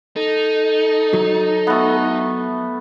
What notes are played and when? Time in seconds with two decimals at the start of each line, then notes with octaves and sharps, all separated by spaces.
0.16 D#4 A4
1.13 F#3
1.67 A3 B3